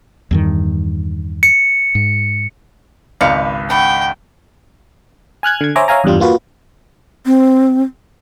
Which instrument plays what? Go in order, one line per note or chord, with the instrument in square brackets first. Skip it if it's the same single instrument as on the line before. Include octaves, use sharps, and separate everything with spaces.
[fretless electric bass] E2 G2 D#3
[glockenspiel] C#7
[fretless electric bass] G#2
[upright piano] G#1 C#2 C#7 [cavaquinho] B4 [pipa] D5 F5
[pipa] D4 [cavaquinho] F#5 B5 C#6 [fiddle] G5
[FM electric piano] G#5 F6 F#6 G#6
D3 G#6
C5 C#5 E5 G#5 A#5 D6
C#5 E5 F5 G#5 A#5
E2 G2 G3 F4
A#3 F4 F#4 B4
[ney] C4